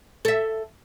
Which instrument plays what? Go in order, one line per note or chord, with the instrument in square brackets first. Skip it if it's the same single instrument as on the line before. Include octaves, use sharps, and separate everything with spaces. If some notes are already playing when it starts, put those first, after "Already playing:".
[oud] A4 E5